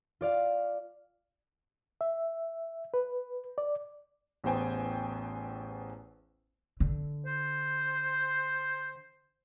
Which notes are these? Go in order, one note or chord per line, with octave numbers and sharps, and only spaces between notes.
F4 D5 F5
E5
B4
D5
A1 E2 B3 C5 G5 G#5
D3
C5